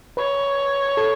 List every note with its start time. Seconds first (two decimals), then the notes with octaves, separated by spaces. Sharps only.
0.17 B4 C#5
0.97 A4